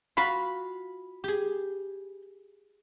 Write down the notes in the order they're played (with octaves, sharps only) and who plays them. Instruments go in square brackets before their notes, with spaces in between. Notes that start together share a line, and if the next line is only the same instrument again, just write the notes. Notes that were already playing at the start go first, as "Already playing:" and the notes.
[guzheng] F4 F#4 F5 [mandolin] B5
[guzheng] G4 G#4